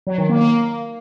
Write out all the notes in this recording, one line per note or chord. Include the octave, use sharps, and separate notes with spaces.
F#3
D#3
A#3
A#3